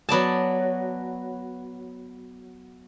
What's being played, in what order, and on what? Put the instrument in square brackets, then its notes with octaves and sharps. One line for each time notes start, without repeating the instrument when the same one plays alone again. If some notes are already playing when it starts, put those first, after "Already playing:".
[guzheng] F#3 B3 D5 A5